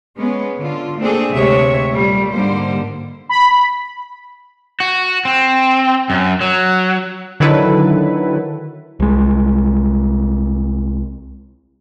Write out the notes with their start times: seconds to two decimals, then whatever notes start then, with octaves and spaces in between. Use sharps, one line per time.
0.18 G#3 B3 C#4
0.59 D3 F4
0.99 A3 A#3 C4 D4 G#4 A4
1.32 D2 C3 G#3 G4 C#5 E5
1.92 A#2 G3 A3
2.33 G#2 D3 G3 A#3 C5
3.29 B5
4.80 F#4
5.25 C4
6.10 F#2
6.41 F#3
7.40 D3 D#3 F#3 E4 A4 B4
9.00 C2 G#3